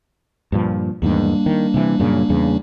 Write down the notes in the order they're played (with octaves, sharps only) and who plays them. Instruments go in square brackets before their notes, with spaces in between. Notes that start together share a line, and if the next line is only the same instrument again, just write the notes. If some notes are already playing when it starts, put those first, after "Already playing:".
[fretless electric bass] G2 A#2 F3
[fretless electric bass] E2 G#2 D#3 [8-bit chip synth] G3 A#3 D4
[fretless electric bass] D#3
C3 E3
F#2 A#2 C#3
E2 C#3